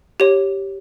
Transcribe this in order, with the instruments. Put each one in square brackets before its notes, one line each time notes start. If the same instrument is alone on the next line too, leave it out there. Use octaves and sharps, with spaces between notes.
[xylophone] G4 C#5